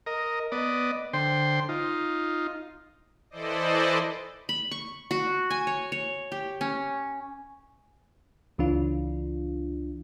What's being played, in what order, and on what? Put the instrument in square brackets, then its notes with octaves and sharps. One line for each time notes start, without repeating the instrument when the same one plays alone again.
[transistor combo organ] A#4 D#5
B3 D5 D#5
D3 C5 G5 C6
D#4 F4
[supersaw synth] E3 E4 A4 C5 D5 D#5
[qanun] B5
C#6
F#4
G#5
C#5
C#5
G4
C#4
[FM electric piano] C#2 E3 D4 F4